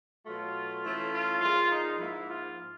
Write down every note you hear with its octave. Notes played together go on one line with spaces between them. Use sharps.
B2 F#3 A3 F4
E3 A3 C#4
F4
A#2 F3 G#3 F4
D#4
G#2 F3 A#3 E4
F4